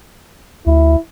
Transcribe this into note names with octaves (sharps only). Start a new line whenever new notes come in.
D2 E4